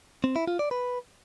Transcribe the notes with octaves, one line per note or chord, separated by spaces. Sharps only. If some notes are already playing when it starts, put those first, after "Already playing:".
C4
E4
F4
D5
B4